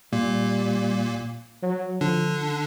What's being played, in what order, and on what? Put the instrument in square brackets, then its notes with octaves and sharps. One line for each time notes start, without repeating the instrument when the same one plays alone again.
[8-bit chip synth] A#2 A#3 [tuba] G3
[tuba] F#3
[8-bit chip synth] D3 D4 [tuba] F3